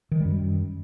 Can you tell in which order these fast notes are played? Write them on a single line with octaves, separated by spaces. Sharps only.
D#3 F3 G3 F#2